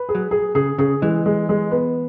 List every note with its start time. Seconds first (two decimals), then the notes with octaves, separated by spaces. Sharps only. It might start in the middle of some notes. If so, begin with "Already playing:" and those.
Already playing: B4
0.09 G#4
0.15 F#3
0.31 G#4
0.55 C#3 G#4
0.78 C#3 G#4
1.02 E3 G#3
1.26 G#3
1.49 G#3
1.71 B3